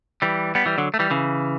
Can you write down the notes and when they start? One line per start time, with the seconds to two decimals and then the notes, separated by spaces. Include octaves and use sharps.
0.22 E3 G3
0.55 G3 B3
0.66 E3 G3
0.78 D3 F#3
0.94 A3
0.99 E3 G3
1.10 C#3 E3